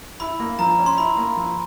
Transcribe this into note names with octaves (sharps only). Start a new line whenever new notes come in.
E4 B5
A#3
F3 A#5
C#4
C6
E4 B5
A#3
F3